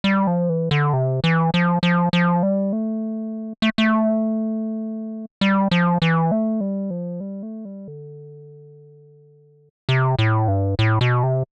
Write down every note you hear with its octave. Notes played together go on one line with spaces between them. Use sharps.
G3
F3
E3
D3
C3
E3
F3
F3
F3
G3
A3
A3
A3
G3
F3
E3
A3
G3
F3
G3
A3
G3
D3
C3
A2
G2
A2
B2
C3